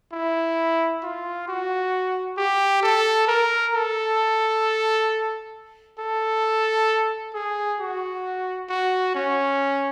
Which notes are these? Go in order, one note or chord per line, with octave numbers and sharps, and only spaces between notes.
E4
F4
F#4
G4
A4
A#4
A4
A4
G#4
F#4
F#4
C#4